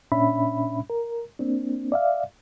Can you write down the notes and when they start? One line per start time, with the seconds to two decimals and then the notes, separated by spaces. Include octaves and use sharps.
0.12 A#2 C#4 D4 E5 B5
0.90 A#4
1.40 A#3 C4 D4
1.92 D5 E5 F5